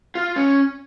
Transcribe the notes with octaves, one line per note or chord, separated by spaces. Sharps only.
F4
C#4